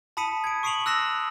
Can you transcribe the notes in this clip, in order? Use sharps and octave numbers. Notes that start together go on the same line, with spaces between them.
A5 B5 D#6 B6 C#7 D#7
G#6 D7
C#6 D#6 C7 D7 F7 F#7
E6 F#6 A#6 C7 E7 F7